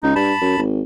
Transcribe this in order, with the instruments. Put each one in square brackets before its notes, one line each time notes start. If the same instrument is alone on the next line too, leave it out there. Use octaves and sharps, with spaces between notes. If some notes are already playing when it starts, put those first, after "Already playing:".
[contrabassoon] C#2 [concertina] D#4
[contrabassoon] G2 [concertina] A5 B5
[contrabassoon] F#2
G#1